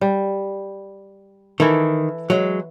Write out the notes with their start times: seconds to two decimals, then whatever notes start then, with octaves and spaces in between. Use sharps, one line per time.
0.01 G3
1.60 D#3 E3 E4 A4
2.30 F#3 G#3